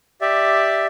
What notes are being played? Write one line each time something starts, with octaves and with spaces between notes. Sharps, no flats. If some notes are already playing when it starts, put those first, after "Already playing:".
G4 D5 E5